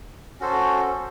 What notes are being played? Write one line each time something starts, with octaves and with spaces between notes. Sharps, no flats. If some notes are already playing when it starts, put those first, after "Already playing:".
C#4 F#4 A4 C5